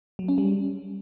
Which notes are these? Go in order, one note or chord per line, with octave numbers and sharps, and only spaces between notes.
F#3
C#4
G3